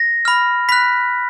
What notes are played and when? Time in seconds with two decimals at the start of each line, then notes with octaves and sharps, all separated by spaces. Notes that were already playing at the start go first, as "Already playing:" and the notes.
Already playing: A#6
0.25 B5 F6
0.69 B5 F#6 B6